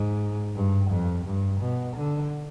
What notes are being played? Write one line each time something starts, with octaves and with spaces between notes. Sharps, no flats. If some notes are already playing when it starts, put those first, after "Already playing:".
Already playing: G#2
G2
F2
G2
B2
D3